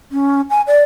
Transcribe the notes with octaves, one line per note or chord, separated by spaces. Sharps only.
C#4
G#5
D5